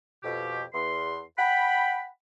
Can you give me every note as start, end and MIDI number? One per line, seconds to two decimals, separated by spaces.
0.23 0.62 41
0.23 0.62 47
0.23 0.62 67
0.73 1.19 40
0.73 1.19 84
1.38 2.06 78
1.38 2.06 79
1.38 2.06 83